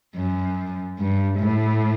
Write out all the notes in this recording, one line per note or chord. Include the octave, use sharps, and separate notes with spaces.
F#2
G2
A2